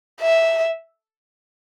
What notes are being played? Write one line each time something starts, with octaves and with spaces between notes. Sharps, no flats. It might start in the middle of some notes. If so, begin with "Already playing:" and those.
E5